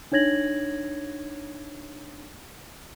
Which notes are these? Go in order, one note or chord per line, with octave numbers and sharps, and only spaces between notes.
D4 D#4 C#5 G#6 A#6 F#7